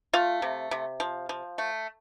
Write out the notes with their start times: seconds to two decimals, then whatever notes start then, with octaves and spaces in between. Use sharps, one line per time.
0.13 A3 F4 F5
0.42 C3
0.71 C3
1.00 F3
1.29 F3
1.58 A3